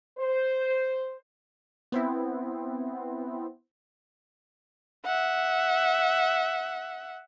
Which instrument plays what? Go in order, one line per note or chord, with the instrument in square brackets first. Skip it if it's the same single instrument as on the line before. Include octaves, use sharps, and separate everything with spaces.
[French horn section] C5
[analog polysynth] B3 C4 E4
[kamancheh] E5 F#5